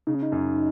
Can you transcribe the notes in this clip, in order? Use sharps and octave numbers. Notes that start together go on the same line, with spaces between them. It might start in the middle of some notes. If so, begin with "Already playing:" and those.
C#3 D#4
C#4
D#4
F#2